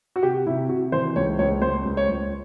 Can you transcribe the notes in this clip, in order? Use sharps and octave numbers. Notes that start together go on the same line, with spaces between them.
F#4
C3 G4
C3 E4
C3 F#4
E3 C5
C#2 C#5
C#2 C#5
C#2 C5
C#2
C#5
C#2